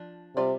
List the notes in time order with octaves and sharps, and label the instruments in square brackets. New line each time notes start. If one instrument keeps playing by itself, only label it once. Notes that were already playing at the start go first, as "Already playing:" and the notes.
Already playing: [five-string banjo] F3 D4 F4
[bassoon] C3 [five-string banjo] G3 F4 D5